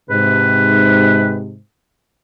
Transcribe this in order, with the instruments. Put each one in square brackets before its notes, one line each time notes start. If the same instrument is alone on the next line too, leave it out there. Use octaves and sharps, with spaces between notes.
[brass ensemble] G#2 C3 [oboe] B4